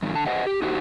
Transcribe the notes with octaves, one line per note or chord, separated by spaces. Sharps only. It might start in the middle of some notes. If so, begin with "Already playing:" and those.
E2 G2 D#3
D3 A5
B4 C5 D#5 F#5
G4
D#4 F#4 G4 C5